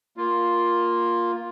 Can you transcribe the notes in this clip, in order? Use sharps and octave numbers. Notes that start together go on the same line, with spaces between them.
A#3 F4